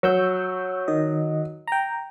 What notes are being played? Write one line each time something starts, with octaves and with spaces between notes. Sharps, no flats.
F#3 C#6 E6 G6
D#3 D#5
G5 A#5